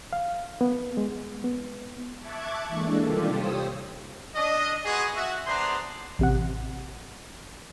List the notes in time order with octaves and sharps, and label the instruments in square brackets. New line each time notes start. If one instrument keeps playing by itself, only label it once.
[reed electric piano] F5
B3
G#3
B3
[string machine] E5 A5 C#6 D6 F#6 G#6
E3 G#3 A#3 D4 A4
C3 D#3 G3 F4 G4 A4
G4 C5 C#5 D#6 E6
[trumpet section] D4 D#5
G#3 B3 F#4 G#4
F#4 E5
B3 D4 G#4 C5 A#5 C6
[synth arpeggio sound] A1 C3 F#5